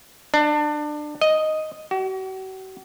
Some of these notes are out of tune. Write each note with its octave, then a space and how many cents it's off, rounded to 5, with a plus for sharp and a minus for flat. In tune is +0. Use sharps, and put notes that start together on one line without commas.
D4 +25
D#5 +0
F#4 +40